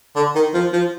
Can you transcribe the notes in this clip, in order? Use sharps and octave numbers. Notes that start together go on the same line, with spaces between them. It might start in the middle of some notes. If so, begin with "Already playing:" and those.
D3
D#3
F3
F3